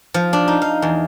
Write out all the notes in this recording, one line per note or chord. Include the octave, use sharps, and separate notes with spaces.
F3
D4
D#4
F5
E2